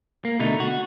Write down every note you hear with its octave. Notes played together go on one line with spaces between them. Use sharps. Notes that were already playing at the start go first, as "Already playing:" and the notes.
A#3
B2 D3 A3 D#4
F#4